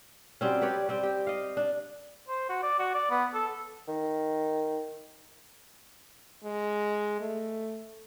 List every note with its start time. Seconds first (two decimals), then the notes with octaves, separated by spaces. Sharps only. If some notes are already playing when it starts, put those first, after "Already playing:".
0.41 F#3 G3 C4 C#4
0.62 G4 B4 C#5 D5
0.89 G3 C4
1.03 G4
1.27 D#5 F5
1.57 D4
2.28 C5
2.49 F#4
2.63 D5
2.79 F#4
2.95 D5
3.10 B3
3.34 A4
3.88 D#3
6.44 G#3
7.21 A3